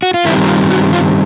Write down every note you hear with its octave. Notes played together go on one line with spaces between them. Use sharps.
F#4
F4
G2 D#3 G3 C4 E4
F4
F#4
F4